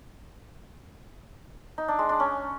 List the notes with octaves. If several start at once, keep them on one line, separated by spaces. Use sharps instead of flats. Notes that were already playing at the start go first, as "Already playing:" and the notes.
D#4
D4
G#3
D4
C#4